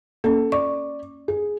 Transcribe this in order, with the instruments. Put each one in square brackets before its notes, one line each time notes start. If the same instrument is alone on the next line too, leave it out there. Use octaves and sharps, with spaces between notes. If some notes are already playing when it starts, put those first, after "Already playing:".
[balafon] A#3 C#4 [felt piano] A4
[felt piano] D5 [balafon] C#6
[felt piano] G#4